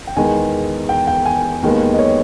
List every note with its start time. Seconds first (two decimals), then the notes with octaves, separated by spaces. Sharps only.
0.07 G5
0.17 E2 D#3 G#3 B3 G#5
0.89 G5
1.07 G5
1.26 G#5
1.63 D#2 D#3 G#3 B3
1.94 D#5
1.99 C#5